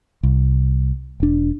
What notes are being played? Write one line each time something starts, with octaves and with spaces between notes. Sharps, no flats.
C2
E1 D4